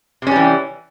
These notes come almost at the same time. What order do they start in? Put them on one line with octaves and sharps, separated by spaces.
C3 C#4 G3 E3